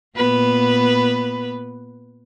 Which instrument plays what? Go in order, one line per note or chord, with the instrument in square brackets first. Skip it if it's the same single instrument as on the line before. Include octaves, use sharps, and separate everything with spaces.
[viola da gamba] A#2 B3 B4